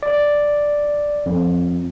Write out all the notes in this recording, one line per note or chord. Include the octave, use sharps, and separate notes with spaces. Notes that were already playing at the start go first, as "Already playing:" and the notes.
D5
F2